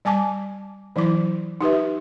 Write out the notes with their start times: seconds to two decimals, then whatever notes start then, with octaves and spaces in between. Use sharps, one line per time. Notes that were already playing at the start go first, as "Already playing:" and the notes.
0.05 G3 G#5 A5 D6
0.96 E3 F#3 E4 D6
1.61 D#4 G4 B4 E5